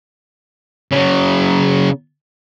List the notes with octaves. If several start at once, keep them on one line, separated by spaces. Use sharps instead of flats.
C#3 F#3